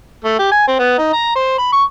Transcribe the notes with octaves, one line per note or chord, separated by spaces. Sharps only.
A3
G4
G#5
C4
B3
D#4
A#5
C5
B5
C#6